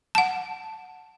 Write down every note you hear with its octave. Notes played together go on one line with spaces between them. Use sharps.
F#5 A5